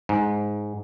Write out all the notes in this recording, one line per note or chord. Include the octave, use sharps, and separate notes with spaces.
G#2